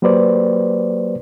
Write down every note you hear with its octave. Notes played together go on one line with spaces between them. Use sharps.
F#3 A#3 G4 B4 C5 D5